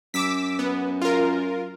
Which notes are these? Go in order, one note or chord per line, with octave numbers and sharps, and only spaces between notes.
F#2 D6 E6 B6
B3
F4 A#4